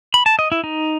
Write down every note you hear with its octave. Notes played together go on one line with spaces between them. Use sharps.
B5
A5
D#5
E4
D#4